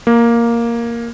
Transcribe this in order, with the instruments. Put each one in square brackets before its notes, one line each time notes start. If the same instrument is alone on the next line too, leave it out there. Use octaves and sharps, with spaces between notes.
[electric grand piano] A#3